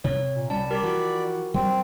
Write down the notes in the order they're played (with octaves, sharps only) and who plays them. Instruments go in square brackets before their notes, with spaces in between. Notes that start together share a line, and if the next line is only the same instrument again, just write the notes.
[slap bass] C3 [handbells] C#5
[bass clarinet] A#2
[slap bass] C2 C#4 [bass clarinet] G3 [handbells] A5
[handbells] G4 A#4 [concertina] D5 B5
[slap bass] E3 F3 [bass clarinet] F#4
[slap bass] F#3 G3 D4 [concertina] C4